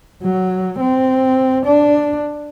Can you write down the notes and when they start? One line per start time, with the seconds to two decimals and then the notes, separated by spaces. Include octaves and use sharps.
0.23 F#3
0.81 C4
1.66 D4